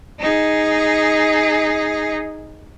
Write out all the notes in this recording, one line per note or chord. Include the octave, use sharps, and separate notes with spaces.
D#4 G#4